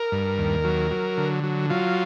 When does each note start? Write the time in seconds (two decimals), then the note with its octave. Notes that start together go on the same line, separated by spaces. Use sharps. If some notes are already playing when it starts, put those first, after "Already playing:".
Already playing: A#4
0.12 G2
0.38 D#2
0.64 F#3
0.91 F#3
1.17 D3
1.44 F#3
1.70 F#3 F4